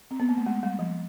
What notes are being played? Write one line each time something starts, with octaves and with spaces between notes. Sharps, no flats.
C4
B3
A#3
A3
G#3
G3
F3